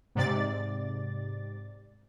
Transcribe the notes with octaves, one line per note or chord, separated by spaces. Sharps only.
G#2 C3 D5 A6